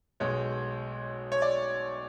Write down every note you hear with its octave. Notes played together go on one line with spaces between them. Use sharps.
B1 B2 G#3 C#5
C#5
D5